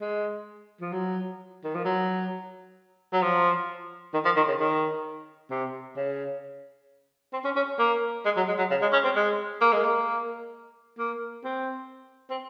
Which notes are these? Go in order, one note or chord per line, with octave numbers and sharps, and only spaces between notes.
G#3
F3
F#3
D#3
F3
F#3
F#3
F3
D#3
F3
D#3
C#3
D#3
C3
C#3
C4
C#4
C#4
A#3
G#3
F#3
G#3
F#3
C#3
G#3
C#4
C4
G#3
A#3
G#3
A#3
A#3
C4
C4